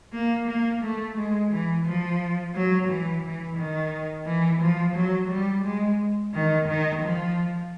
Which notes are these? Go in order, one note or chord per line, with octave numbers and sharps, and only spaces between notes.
A#3
A#3
A3
G#3
E3
F3
F#3
E3
E3
D#3
E3
F3
F#3
G3
G#3
D#3
D#3
F3